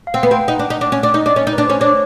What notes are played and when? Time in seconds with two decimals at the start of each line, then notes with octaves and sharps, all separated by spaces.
0.07 F5
0.14 C4 F#5
0.23 B3
0.31 C4 G5
0.48 D#4 F#5
0.59 D4
0.70 D#4
0.81 D4
0.92 C#4
1.03 D4
1.14 D#4 D#5
1.26 D4
1.31 D5
1.36 C#4
1.47 D#4
1.53 B4
1.58 D4
1.67 C#4 C5
1.80 D4 C#5